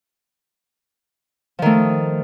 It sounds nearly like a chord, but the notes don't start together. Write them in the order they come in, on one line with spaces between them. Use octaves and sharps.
F3 D#3 A3